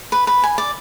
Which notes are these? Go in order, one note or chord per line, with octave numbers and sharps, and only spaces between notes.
B4
B4
G#5
D5